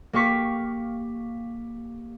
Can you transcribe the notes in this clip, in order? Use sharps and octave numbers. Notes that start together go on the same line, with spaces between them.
A#3 G4 F5 C#6 B6